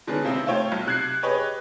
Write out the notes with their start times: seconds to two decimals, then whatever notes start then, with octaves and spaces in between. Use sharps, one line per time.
0.07 D3 D#3 G#3 B3 C#4
0.24 C3 A#3 C4 D#4 E4
0.46 A3 F4 C5 C#5 G5
0.72 B1
0.86 C3 F#6 G#6 C7
1.23 G4 G#4 B4 C#5 D#5